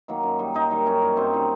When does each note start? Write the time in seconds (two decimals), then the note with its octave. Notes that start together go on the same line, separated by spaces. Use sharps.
0.08 D#3 F#3 A#3
0.23 F#2
0.39 D#3 G3
0.54 F#2 D#4
0.71 D#3 G3
0.86 F#2 C#4
1.01 D#3 G3
1.17 F#2 C4
1.33 D#3 G3